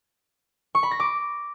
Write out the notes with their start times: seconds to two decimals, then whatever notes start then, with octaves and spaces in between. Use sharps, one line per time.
0.75 C#6
0.83 B5
0.91 A#6
1.00 D6